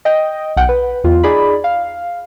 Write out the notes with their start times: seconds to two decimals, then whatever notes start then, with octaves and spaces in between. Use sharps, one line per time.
0.05 D#5 G5
0.57 B1 F#5 G5
0.69 B4
1.04 E2 F4
1.23 D#4 G#4 D5 B5
1.64 F5